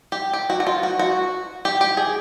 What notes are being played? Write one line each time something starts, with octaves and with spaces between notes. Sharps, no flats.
G4
G4
F#4
F#4
F4
F#4
F#4
G4
G4
G#4